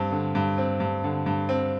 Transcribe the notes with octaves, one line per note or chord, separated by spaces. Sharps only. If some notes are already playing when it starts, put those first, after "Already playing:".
Already playing: G2 C4
D3
G2
C4
G2
D3
G2
C4